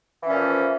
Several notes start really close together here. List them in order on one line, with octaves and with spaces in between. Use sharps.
E3 C#4 A#2 F3